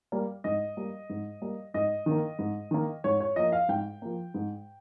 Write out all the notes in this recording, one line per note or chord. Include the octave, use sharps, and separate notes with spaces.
G3 A#3
G#2 D#5
G3 A#3
G#2
G3 A#3
G#2 D#5
D#3 A#3
G#2
D#3 A#3
G#2 C#5
C#5
F3 A#3 D#5
F5
G#2 G5
F3 A#3
G#2